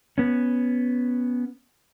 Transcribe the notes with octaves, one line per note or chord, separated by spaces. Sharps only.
B3 C#4